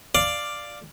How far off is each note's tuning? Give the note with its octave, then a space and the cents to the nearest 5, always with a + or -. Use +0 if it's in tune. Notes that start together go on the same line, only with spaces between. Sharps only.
D5 +5 F5 +0